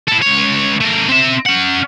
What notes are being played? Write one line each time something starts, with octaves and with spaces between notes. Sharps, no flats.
E4 A4
C#2 C#5
A3 A#4
C4 E5
C#4 F#5